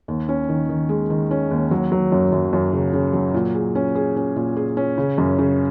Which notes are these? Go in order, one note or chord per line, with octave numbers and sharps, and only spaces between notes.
D#2
C#4
D#3
D#3
G#3
D#3
C#4
D#2
F#3
F#3
F#2
F#2
F#2
C#3
C#3
F#3
A#2
G#4
C#4
G#4
C#4
A#2
G#4
C#4
C#3
F#2
C#3